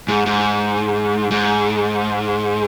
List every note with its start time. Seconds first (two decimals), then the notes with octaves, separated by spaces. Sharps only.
0.08 G#2
0.26 G#2
1.31 G#2